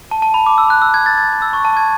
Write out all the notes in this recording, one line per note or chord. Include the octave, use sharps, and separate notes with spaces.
A5
A5
B5
D6
E6
F#6
E6
G#6
A6
G#6
E6
C#6
A5
G#6